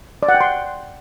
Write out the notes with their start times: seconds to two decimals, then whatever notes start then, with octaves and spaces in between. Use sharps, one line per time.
0.23 D5
0.29 F#5
0.35 G5
0.41 C6